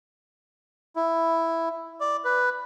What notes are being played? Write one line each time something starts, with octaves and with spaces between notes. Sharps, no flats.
E4
D5
B4